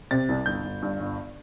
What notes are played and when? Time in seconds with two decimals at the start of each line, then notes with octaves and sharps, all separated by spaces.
0.11 C3 A6
0.29 C2
0.46 G1 G6
0.64 G1
0.82 G2
1.00 G1